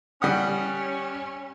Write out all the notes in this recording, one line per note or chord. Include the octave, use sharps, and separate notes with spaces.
G3 C#4 F#5 D#6